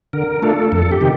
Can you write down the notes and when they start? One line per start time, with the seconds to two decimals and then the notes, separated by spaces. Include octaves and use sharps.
0.13 D3 A#4
0.42 A3 D4 F4 A4
0.72 F2 A4
0.92 G4
1.01 C3 D#3